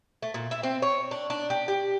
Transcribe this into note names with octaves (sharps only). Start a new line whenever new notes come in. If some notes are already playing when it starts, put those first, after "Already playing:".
A3
A#2
E4
C4
C#5
D4
D4
G4
G4